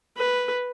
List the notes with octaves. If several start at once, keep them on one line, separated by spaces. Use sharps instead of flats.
B4